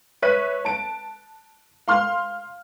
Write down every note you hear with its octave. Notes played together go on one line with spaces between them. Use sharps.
B4 C#5 E5 F#6 B6 D#7
A5 D7
F5 C6 F6